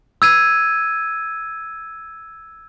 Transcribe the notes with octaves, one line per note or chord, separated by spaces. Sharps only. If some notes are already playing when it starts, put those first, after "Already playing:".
E6 G#6 D#7